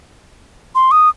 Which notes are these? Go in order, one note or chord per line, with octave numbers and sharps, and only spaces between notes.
C6
D#6